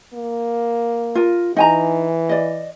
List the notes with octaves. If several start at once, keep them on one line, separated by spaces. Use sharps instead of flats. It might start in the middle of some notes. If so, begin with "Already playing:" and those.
A#3
F4 A#4
E3 D#4 G#5 A#5
D5 D#5